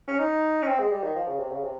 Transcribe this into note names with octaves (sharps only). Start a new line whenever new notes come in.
C#4
D#4
C#4
C4
G#3
G3
D#3
F3
C#3
C3
C#3
C3